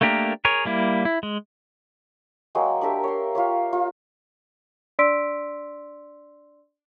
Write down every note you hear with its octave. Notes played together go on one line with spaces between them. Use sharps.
A3 A#3 D4 G4 A#4
G#4 A#4 C#5
G3 A#3 E4
E4
G#3
F#3 G#3 A#3 G5
D4 G4 A#4 E5
C#5 C6
F4 G4 C#5
F4
D4 D5 C6 E6 B6 D7